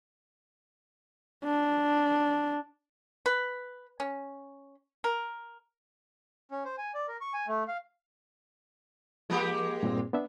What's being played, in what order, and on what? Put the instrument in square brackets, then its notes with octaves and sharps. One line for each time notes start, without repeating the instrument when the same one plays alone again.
[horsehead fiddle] D4
[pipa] B4
C#4
A#4
[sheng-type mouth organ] C#4
C5
G#5
D5
A#4
C#6
G#5
A3
F5
[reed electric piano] F3 [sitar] G#3 A#3 G4
[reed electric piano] G2 A#2 C4
B3 D4 E5